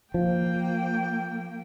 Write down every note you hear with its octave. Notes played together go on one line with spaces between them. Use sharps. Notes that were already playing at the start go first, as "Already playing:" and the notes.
F3 A#3 G5